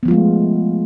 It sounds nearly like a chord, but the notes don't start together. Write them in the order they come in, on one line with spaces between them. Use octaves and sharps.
B3 F3 F4 G#3 A3